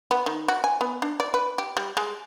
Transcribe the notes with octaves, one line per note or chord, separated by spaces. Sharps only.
B3
D#3
F#4
G#5
B3
D4
D5
B4
G4
G3
G#3